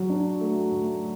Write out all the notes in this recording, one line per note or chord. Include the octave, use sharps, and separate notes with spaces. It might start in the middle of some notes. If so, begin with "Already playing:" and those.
Already playing: F#3
D4
A3
A3